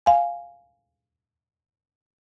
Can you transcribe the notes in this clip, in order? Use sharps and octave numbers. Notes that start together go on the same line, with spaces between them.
F5 G#5